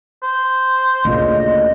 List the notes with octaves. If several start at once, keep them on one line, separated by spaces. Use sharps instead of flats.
C5
D2 A#2 C#3 D#5